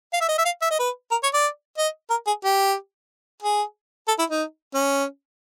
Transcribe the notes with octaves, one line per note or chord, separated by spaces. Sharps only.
F5
E5
D#5
E5
F5
E5
D#5
B4
A#4
C#5
D5
D#5
A#4
G#4
G4
G#4
A4
E4
D#4
C#4